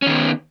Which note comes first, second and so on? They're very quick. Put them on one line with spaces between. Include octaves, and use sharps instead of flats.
C#4 D#3 B3